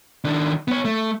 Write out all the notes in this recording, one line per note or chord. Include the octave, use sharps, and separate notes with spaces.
D#3 D4
B3 C#5
A3